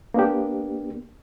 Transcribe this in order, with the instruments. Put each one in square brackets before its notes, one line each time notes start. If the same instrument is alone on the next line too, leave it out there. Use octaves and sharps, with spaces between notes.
[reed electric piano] A#3 B3 D4 G4